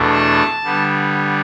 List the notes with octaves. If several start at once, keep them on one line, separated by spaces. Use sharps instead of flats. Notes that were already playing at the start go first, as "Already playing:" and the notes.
Already playing: E2 B2 A3 D4
A5
D3 G3 B3